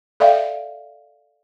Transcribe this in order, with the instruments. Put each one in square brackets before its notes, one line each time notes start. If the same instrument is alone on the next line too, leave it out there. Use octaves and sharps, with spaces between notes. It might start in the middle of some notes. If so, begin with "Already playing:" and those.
[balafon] A4 D5 E5 F5 G5